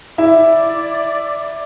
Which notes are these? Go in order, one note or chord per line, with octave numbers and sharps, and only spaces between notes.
E4 D5 E5